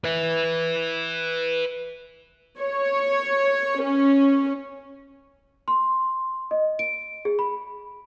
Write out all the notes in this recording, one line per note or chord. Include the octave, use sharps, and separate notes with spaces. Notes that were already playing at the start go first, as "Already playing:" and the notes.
B4 E5
C#5
C#4
C6
D#5
D7
G#4
B5